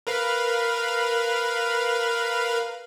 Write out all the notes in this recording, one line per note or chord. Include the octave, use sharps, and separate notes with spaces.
A#4 B4 F5